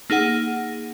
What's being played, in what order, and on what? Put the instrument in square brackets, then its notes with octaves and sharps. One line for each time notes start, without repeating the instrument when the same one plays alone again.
[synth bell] A#3 D#4 G#4 F#5